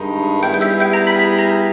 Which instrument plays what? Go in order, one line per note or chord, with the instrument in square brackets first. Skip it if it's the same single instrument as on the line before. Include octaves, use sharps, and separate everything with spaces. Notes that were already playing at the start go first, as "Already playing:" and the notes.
Already playing: [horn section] G2 D#3 G#3 D#4
[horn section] G3 B3 E4 G#4 [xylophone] G5 G6
[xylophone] G6
E5 E6
G5 G6
A#5 A#6
B5 B6
B5 B6
A#5 A#6